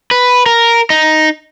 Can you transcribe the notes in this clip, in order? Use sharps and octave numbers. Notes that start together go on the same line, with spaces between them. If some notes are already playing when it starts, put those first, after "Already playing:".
B4
A#4
D#4